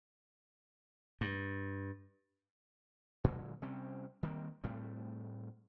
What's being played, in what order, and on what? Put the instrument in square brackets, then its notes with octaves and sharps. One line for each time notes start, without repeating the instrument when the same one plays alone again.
[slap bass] G2
A#2 D3 F#3 G#3
C3 G3 C4 C#4
D#3 G3 A#3 C4
A2 G3 A3 C4